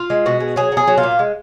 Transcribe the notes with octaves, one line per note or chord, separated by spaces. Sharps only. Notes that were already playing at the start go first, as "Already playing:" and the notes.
Already playing: F4
G#3
B2 F#4
G#3
F#3 G#4
F#3 G#4
F#3
F4
A#2
G#3